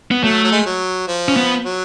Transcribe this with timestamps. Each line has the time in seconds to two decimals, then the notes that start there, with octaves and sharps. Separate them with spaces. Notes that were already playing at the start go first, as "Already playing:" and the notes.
0.11 B3
0.23 F#3 A3
0.44 F#3
0.52 G#3
0.65 F#3
1.08 F3
1.28 C#4
1.36 B3
1.64 F#3